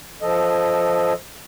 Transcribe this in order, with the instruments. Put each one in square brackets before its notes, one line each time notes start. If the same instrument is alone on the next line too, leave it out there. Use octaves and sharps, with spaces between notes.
[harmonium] F3 A4 D#5